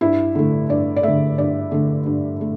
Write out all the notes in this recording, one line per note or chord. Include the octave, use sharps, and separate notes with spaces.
G2 E4
D3 A3
G2 D5
D5
D3 A3 E5
G2 D5
D3 A3
G2
A3